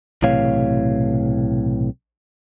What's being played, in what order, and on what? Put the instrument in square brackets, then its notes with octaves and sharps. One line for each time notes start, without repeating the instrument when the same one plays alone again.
[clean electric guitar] B1 A2 C3 E3 C#5 F5